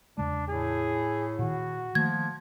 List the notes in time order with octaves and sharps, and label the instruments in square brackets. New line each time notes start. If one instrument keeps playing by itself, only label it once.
[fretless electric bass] E2 C#3 G#3 [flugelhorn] D4
[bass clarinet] A2 [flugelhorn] G#4
[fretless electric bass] A#2 D#3 [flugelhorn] F#4
[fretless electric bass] D#3 A3 A#3 [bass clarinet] F3 [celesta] G#6